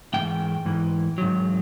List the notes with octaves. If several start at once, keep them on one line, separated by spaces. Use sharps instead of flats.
G#2 E3 G5
G#2 E3
G#2 D#3 F#3